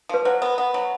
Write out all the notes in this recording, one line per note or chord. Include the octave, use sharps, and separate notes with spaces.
F3 B4
F#3 C5
B3
B3
F#3